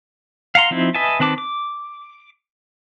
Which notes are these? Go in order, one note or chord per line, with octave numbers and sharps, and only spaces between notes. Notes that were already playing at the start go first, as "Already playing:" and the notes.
F5 F#5 A#5 C6
F3 C4 D#4 E4
B4 D#5 E5 G#5 A5
D#3 C4 B4 A5 D6
D6